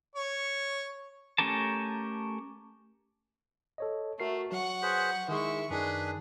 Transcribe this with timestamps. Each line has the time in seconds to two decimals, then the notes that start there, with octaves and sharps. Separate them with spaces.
0.15 C#5
1.38 A3 C#4 G4 A#4 A5
3.78 A4 C#5 D#5
4.20 A3 F#4 A#4 C7
4.52 F#3 F#5 C#6
4.82 G#4 B4 C5
5.29 D#3 G#3 E4 G#4 C#6
5.70 F#2 D#3 D4 D#4 G#4 B4